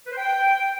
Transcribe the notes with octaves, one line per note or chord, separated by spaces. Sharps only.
B4
C5
G5